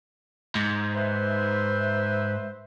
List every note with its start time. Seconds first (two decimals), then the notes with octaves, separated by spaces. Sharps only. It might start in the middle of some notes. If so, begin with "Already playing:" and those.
0.55 G#2
0.95 B4 C5 E5